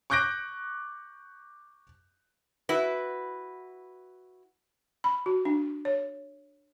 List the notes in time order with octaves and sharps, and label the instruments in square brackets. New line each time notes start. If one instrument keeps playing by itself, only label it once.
[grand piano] C#6 D6 F#6 G6 A#6 D7
[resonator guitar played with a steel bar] E4 F#4 B4
[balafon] B5
F#4
D4
C#5